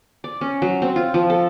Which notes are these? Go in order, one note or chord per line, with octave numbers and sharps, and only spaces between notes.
D5
C#4
F#3
C4
F4
F3
A4